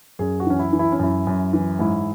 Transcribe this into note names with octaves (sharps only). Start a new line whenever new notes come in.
F#2 G#4
F#4
E3 C#4
E4
E3
E4
C#4
F#2 E4
F#2
E3
G#2 E4